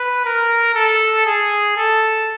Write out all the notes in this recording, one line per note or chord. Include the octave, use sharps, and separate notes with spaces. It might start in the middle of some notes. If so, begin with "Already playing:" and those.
Already playing: B4
A#4
A4
G#4
A4